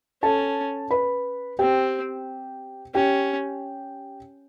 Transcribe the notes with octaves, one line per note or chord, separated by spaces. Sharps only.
C#4 A4 A5
B4 B5
C4 G4 G5
C#4 G4 G5